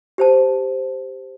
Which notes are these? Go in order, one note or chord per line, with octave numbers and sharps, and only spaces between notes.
G4 C5 A5